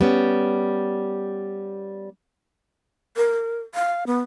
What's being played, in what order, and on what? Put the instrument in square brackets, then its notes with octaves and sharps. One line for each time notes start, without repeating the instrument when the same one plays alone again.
[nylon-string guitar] G3 B3 C#4
[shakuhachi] A#4
F5
B3